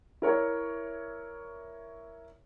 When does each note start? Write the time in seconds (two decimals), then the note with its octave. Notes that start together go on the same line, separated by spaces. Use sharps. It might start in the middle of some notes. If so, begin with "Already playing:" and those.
0.22 E4 A#4 C#5 D5